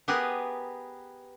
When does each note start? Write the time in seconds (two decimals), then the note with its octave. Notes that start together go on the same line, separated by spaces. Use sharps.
0.08 B3 G4 G#4 A#4 B4